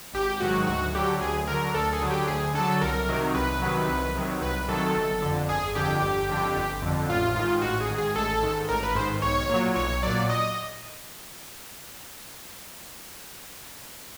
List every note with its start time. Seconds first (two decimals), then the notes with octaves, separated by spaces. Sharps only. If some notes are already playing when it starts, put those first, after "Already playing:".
0.14 G#1 G4
0.40 G#2 D#3 F#3 F#4
0.67 D2 F#4
0.95 D3 F#3 G4
1.21 D2 G#4
1.47 D3 F#3 A#4
1.64 A#4
1.75 D2 A4
1.93 G#4
2.02 D3 F#3
2.10 G4
2.27 D2 G#4
2.54 D3 F#3 A4
2.81 C2 A#4
3.09 C3 D#3 F#3
3.35 C2 B4
3.62 C3 D#3 F#3
3.89 C2
4.15 C3 D#3 F#3
4.41 C2 B4
4.68 C3 D#3 F#3 A4
4.95 G1
5.22 F2 D3
5.49 G1 G#4
5.75 F2 D3 G4
6.02 G1
6.29 F2 D3
6.56 G1
6.82 F2 D3
7.08 A1 F4
7.35 G#2 D#3 F4
7.62 A1 F#4
7.80 G#4
7.89 G#2 D#3
7.98 G#4
8.15 A1 A4
8.43 G#2 D#3
8.69 A1 A#4
8.83 B4
8.95 G#2 D#3 C5
9.22 B1 C#5
9.50 A#2 F#3
9.76 B1 C#5
10.03 A#2 F#3 D5
10.30 D#5